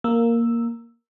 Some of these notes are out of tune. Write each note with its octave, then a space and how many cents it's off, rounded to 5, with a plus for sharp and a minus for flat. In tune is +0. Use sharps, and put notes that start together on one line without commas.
A#3 +0 A#4 -10 E6 +0